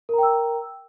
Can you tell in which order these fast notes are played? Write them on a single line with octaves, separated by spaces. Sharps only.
A#4 A#5 G5 E6